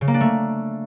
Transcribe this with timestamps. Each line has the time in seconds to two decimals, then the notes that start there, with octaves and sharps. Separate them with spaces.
0.01 C#3
0.08 A#3
0.14 D4
0.21 A3